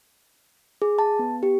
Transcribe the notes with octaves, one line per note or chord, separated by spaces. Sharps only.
G#4
A5
B3
G4